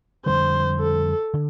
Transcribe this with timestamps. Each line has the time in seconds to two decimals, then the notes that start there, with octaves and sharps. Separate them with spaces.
0.26 F2 D3 G3 C5
0.80 A4
1.34 D3